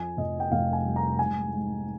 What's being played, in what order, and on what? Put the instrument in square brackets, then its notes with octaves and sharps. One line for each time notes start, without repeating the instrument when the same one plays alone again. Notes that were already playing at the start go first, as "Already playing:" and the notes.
Already playing: [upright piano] F2 G#5
F1 D#5
G5
F1 F5
G#5
G3
A#5
G#2 G#5
G#2